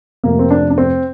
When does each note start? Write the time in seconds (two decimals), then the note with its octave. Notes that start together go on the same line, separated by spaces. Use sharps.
0.24 F2 C3 F3 A3 A#3
0.39 C4
0.51 D4
0.71 D4
0.78 C4